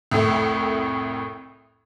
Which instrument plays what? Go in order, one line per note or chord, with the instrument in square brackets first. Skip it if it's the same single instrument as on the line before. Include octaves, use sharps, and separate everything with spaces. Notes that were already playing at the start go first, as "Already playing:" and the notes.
[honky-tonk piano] C2 F2 A2 A3